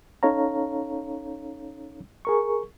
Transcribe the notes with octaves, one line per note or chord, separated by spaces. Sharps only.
C#4 D#4 A4 C#5 F5 A#5
G#4 A#4 C#6